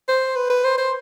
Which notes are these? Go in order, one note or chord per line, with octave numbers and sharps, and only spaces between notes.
C5
B4
B4
C5
C5